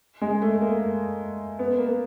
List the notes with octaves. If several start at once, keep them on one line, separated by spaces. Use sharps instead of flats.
G#3
A3
A#3
B3
A#3